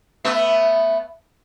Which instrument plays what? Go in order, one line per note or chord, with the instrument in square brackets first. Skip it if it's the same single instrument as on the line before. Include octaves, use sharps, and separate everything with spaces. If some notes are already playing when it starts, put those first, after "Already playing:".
[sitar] A3 B3 E5